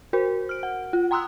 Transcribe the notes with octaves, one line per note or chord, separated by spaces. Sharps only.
F#4 A#4 C5
F6 D7
F#5
F4
G5 A#5 C6 D#6 E6 F#6